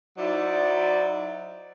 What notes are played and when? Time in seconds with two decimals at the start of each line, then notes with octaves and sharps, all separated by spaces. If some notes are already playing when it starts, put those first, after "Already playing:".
0.18 F#3 D#4 E4 C5 D5